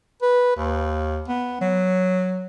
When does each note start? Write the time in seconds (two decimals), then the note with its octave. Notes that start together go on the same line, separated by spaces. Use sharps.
0.22 B4
0.56 D#2
1.28 B3
1.61 F#3